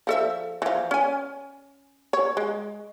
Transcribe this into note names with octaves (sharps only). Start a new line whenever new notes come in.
F3 A4 E5
E3 F3
C#4 G#5
C#5
G#3